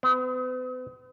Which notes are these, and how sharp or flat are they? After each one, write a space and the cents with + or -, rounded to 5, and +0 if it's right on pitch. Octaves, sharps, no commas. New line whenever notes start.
B3 +45